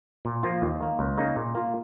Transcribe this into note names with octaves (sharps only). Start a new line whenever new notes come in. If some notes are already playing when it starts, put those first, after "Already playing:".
A#2
F3 A#3 F4
D#2
D#3 A#3
C#2
C#3 A#3 D#4
A#2
A#3 F4